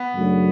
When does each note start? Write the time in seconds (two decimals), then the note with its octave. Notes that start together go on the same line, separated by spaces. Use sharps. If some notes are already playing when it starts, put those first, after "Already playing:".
Already playing: B3
0.12 F#2 C#3 F#3 A3 D4